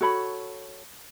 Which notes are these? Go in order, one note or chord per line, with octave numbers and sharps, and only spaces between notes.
F#4 A4 C#5 B5